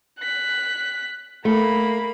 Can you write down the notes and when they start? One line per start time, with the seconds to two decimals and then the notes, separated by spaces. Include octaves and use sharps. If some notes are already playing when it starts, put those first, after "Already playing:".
0.20 F#6 B6
1.45 A3 A#3 B5